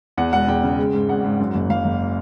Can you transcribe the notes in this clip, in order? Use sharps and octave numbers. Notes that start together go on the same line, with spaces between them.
E2 F#5
E1 F#5
E2 G5
C#3
G#3
G#2
G#1 F#5
G#2
F#2
F#1
F#1 F5
F#1